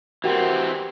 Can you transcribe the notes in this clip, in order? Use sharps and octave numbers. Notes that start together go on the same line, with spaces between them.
E3 C4 F#4 G4 A#4 F#5